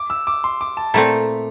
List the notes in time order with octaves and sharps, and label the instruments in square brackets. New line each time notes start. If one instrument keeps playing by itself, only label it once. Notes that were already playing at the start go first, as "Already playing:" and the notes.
Already playing: [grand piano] D6
E6
D6
C6
D6
A5
[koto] A#2 A3 C4 E4 A4 [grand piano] A#5